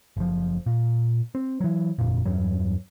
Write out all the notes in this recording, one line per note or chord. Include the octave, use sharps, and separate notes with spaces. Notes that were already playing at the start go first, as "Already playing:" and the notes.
F#1 F3
A#2
C4
E3 F#3
G1 F2 A#2
E2 G2 F#3